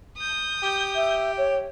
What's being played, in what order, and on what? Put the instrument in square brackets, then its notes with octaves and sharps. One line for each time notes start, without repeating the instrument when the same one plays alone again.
[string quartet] D#6 G6
[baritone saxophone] G4
[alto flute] E5
C#5